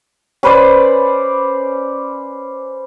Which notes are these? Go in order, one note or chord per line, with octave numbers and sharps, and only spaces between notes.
C#4 B4 C5 D5